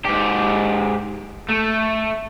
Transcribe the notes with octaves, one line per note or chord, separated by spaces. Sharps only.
G#2 G4
A3